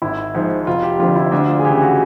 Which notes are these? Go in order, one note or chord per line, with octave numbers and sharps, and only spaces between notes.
G#1 E4
G#2 F3
F1 F4
G4
F2 D3 F3 F4
E4
D2 D4
F4
G#4
C#3 E3 G4
F#4